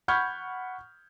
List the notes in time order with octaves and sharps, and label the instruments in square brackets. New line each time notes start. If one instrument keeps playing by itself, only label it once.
[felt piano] F#5 B5 C#6 F6 G6 G#6